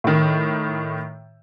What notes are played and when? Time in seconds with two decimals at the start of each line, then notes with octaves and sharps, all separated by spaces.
0.04 A2 D#3